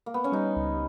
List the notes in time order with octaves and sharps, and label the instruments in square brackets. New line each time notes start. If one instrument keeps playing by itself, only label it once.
[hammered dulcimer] A#3
B3
C#4
[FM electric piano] G3 [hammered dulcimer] D#4
[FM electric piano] C#2